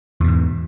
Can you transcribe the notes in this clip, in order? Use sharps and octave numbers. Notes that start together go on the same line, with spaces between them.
E2 G#2 B2